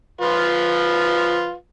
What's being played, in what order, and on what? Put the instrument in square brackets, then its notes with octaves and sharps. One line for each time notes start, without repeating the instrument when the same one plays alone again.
[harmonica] F3 F4 B4